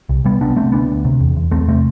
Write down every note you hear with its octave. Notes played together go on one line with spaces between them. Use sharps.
C2
C2 G3 B3
C3 B3 D4
C3 A3 C4
D2 B3 D4
D2
C3
E2
E2
E2 A3 C4
C3 A3 C4